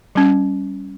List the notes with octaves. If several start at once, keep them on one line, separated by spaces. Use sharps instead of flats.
G3 C#4